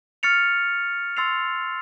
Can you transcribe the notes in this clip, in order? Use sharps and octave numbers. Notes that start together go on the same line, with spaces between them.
C#6 F6 A6 C#7 F7
C6 E6 A6 C7 F7